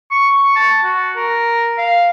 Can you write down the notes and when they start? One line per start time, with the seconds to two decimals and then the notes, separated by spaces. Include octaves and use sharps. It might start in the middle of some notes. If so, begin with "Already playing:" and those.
0.11 C#6
0.56 A5
0.84 F#4
1.16 A#4
1.78 F5